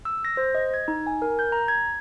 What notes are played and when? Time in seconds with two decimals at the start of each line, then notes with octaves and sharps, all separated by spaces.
0.05 E6
0.25 A#6
0.37 C5
0.55 D#5
0.74 G#6
0.88 D#4
1.07 G#5
1.22 A#4
1.39 G6
1.52 A#5
1.68 G#6